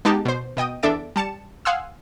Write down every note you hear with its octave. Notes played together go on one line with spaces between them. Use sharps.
G#3 B3 D#4 G4 A5
B2 C5
B2 D#5 G5 D#6
E2 D4 A4 E5 A6 D7
G3 A5 C#7 E7
F5 F#5 G#5 C6 D#6 E6